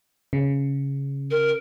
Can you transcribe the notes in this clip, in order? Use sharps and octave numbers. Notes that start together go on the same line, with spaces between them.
C#3
A#4